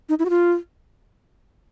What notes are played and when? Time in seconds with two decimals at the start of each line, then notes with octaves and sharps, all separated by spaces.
0.09 D#4
0.19 E4
0.25 F#4
0.30 F4